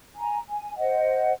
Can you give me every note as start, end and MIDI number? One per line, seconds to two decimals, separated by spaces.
0.16 0.39 80
0.16 0.39 82
0.49 0.77 80
0.77 1.31 72
0.77 1.31 75
0.77 1.31 78